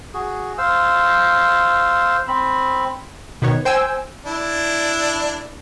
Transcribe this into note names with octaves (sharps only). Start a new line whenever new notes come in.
F#4 G#4
C5 F5 E6
C4 B5
B2 D#3 B3 C#5
C5 G5 G#5 E6
D4 E4